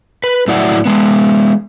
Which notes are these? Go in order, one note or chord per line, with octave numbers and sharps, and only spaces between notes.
B4
A2 F#3 E4 D5 E5 F#5
G#3 B3